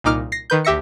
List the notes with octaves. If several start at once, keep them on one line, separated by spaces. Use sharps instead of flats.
C2 A#2 D#4 D6 F6
A#6 C7
D#3 B4 G6
D2 G4 E5 A#6 C#7